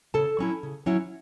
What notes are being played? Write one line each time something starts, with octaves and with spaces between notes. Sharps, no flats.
C#3 A4 A5
F#3 C#4 E4
C#3
F#3 C#4 E4